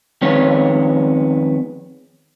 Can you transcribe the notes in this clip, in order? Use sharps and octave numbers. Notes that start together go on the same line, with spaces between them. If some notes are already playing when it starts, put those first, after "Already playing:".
F2 D#3 G#3 B3 C#4 C#5